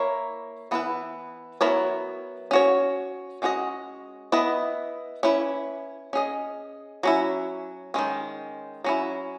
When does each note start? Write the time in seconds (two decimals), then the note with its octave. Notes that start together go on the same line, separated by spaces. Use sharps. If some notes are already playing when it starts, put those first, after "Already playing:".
Already playing: A#3 E4 A#4 C#5
0.71 E3 B3 E4 B4
1.61 F#3 B3 E4 A#4 C#5
2.51 C#4 F#4 C#5
3.42 G#3 C#4 F#4 B4 D#5
4.32 B3 E4 B4 D#5
5.23 C#4 E4 B4
6.13 C#4 G#4 D#5
7.03 F#3 C#4 E4
7.94 D#3 G#3 C#4
8.84 F#3 C#4 E4